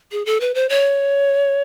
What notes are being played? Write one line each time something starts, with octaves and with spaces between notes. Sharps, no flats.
G#4
A4
B4
C5
C#5